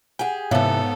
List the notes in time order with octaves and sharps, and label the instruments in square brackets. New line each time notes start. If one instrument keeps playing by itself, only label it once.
[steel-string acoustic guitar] G4 G#4 [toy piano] F#5 G#5
[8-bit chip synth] G#2 B3 [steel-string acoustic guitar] C3 E3 [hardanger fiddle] A4 [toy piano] C#5 F5